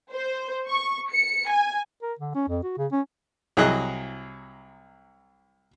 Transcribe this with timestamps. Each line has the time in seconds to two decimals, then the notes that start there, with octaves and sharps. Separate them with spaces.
0.12 C5
0.67 C#6
1.11 C#7
1.49 G#5
2.02 A#4
2.19 D3
2.35 C#4
2.48 F2
2.63 F#4
2.78 C#3
2.92 C#4
3.57 C2 F#3 E4 G#4 D#5 F#6